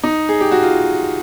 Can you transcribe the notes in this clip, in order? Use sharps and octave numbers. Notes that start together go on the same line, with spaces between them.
D#4
G#4
G4
F#4
F4